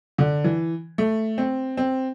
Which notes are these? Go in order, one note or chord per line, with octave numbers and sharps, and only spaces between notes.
D3
E3
A3
C4
C4